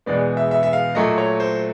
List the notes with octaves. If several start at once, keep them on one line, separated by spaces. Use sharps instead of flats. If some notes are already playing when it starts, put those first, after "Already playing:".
E2 B2 G#3 B3 D5
E5
E5
E5
F5
A#2 F#3 A3 D#5
C#5
C5